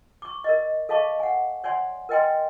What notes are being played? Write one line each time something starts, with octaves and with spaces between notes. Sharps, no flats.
C#6 D6
A#4 D5 D#5
A4 D#5 F5 A5 C#6 D6
F#5 G#5
C#5 D5 F#5 G#5 C6
A#4 B4 D#5 G5 G#5 C6